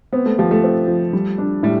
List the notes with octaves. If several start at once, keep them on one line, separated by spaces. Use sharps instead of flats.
B3 C4
A3
F3 G4
A3
C4
F3
G3
D4
A2 G3